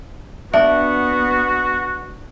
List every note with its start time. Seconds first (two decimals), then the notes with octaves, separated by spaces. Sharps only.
0.54 B3 D4 F#4 E5